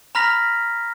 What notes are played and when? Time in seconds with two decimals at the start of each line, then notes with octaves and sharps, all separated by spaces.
0.15 A#5 B5 F6 A#6 B6 F7